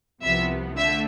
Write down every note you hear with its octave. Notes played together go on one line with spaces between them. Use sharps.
C2 C3 F3 B3 E5
D3 A3 E5